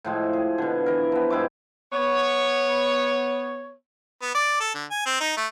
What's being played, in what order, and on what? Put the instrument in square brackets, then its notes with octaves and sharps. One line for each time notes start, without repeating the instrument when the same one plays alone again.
[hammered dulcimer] A2 F3 G#3
G#4
B2 D3
E3 A#4
F3 B3
G2 G#3 E4 D6
[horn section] B3 C#5
[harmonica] B3
D5
A4
D3
G#5
C4
D#4
A3